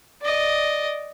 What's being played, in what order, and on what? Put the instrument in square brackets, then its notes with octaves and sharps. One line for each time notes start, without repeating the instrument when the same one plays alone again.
[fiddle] D5 D#5